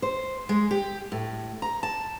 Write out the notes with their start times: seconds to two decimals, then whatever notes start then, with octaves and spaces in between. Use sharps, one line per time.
0.02 C5
0.49 G#3
0.71 G4
1.12 A2
1.62 A#5
1.83 A5